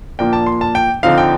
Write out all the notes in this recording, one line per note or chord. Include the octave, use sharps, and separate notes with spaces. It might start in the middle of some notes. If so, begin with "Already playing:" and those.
A#2 F3 A#3 D4 G5
A5
C6
A5
G5
D3 F3 C4 D#4 F5
G5